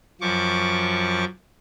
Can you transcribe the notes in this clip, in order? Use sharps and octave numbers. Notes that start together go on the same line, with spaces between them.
F#2 F3 C#6 D6